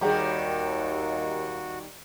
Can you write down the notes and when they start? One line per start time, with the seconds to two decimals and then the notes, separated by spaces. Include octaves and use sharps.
0.01 D#2 D#3 G3 F#4 G#4 G5 A#5